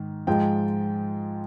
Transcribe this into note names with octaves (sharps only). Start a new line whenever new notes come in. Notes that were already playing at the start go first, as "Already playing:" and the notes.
Already playing: G#2 D#3
G#2 F3 G#3 G5